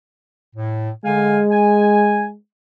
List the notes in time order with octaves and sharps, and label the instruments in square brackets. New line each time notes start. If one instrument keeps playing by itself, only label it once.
[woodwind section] A2
[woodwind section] D3 F5 G#5 [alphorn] G#3
[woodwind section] G#5